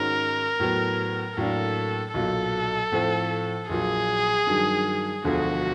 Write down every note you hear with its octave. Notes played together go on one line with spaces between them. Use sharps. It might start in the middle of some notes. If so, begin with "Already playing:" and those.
Already playing: G#2 D#3 G#3 C#4 F#4 A#4
A2 F#3 B3
A2 F#3 A#3 D4 A4
B1 A#2 F#3 A4
A2 F3 A3 C4
A#1 A#2 F#3 G#4
G2 D#3 F#3
E1 D2 D3 F3 A3 F#4